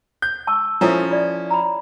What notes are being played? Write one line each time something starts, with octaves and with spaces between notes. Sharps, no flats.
G6
A5 C#6 E6
F3 C#4 E4 A4 E5
F4 D5 E5
A#5 B5